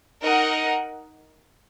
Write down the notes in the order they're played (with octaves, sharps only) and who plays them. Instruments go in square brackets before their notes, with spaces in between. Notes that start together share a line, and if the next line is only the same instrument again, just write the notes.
[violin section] D#4 A#4 D#5 F#5